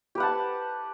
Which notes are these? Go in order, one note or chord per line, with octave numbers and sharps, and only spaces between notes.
G4 B4 F#5 A5